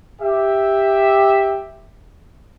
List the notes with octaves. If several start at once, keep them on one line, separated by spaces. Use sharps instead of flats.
G4 E5